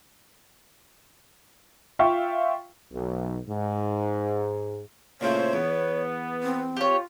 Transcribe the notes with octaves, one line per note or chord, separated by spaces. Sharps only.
F4 E5 F5 G5 C#6
B1
G#2
A#2 C#3 A3 E4 C5 C#5
E2 B3
C4
F4 G4 C#5